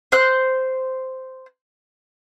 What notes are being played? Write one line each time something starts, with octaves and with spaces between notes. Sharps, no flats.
C5 F#6